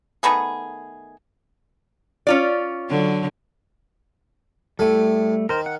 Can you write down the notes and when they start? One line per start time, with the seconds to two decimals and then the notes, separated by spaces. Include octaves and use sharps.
0.23 D#3 A3 B3 G#4
2.27 C#4 F4 D5
2.90 D3 F#3
4.79 A2 G3 A3 A4 G#5
5.49 D#3 A#4 C5
5.66 F#5